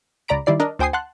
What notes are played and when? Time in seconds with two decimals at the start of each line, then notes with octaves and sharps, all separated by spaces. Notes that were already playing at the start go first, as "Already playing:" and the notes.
0.28 C#2 D5 A#5 B5 D7
0.46 D#3 G3 E4 D5 C7
0.60 D4 A#4 D#5
0.79 D2 C5 G5 G#5 D#6 C7
0.93 F#5 A5 C6 F#6